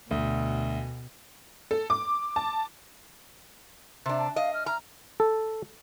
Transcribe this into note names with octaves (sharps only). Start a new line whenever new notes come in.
D2 B2
A4
D6
A5
C3 D4
A5
D#5 F5
F6
A#5 F6
A4